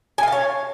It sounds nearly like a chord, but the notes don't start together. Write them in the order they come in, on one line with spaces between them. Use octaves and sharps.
G#5 F5 A5 C#5